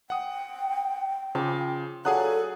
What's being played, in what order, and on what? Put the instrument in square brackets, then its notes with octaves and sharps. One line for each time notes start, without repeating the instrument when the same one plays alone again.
[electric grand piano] F#5 D#6 [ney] G5
[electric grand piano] C#3 [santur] F3 D6
[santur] F#3 D4 F5 [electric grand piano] G#4 D#6 F#6 [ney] A4